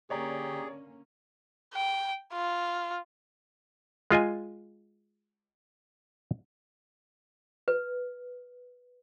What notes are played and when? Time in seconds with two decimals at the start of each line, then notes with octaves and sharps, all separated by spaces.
0.10 D3 A#3 C#4 G4 G#4 C#5 D5 A#5
1.74 G5
2.33 F4
4.11 G#3 F4 D#5 G#5
7.68 B4